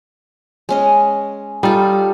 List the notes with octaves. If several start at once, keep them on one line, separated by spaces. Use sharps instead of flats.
G#3 C#4 D#5
G3 D#4 F4 A4